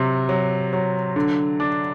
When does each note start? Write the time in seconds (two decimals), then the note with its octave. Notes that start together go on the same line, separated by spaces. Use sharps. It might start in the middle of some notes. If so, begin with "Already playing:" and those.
Already playing: C3 F#3
0.29 F#3
0.73 F#3
1.16 D3
1.60 D4